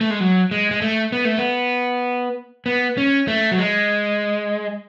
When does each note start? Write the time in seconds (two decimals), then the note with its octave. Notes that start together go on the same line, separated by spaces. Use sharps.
0.01 A3
0.10 G#3
0.20 F#3
0.51 G#3
0.71 G#3
0.82 A3
1.12 B3
1.25 A3
1.38 B3
2.66 B3
2.97 C#4
3.28 A3
3.51 F#3
3.59 G#3